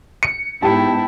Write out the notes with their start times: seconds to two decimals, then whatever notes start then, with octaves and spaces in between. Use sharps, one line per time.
0.23 C#7
0.62 G#2 B3 D#4 E4 G4 G5 A5